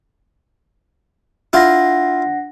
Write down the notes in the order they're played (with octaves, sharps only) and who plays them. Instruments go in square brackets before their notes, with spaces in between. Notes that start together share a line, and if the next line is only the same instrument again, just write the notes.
[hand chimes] D4 F#5 A#6 [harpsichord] E4 F4